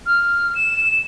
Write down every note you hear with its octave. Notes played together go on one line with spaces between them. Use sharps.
F6
E7